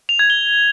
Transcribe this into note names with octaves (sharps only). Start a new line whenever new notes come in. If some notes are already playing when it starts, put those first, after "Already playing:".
F7
G#6
G7